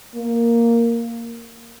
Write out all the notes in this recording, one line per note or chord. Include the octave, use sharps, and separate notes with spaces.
A#3